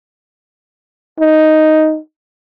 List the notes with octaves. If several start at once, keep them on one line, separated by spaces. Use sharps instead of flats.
D#4